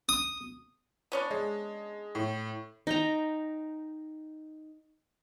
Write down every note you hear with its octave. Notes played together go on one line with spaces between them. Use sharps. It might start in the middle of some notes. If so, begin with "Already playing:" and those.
D#6
B3 C#4 D4
G#3
A2
D#4 G5 A#5